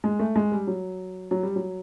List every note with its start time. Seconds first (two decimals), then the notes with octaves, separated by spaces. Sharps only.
0.04 G#3
0.19 A3
0.36 G#3
0.52 G3
0.67 F#3
1.31 F#3
1.43 G3
1.56 F#3